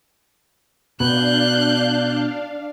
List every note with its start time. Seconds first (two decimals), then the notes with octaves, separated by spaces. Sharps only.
1.00 B2 D4 F5 F#6 G6